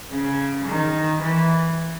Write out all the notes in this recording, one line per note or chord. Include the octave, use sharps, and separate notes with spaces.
C#3
D#3
E3